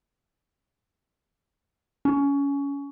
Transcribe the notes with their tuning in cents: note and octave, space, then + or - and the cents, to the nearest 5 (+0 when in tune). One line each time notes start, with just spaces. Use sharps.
C#4 +20